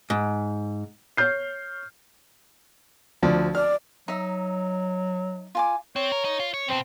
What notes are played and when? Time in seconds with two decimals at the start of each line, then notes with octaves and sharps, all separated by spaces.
0.10 G#2
1.17 C#5 F6 G6 C7
3.23 D2 F3 D5
3.55 D5 F6
4.08 F#3 D#4 E5
5.55 F4 G#5 D6
5.96 C4 C#5
6.12 A#4
6.25 D#4
6.40 F4
6.54 C#5
6.69 E2 B2 C4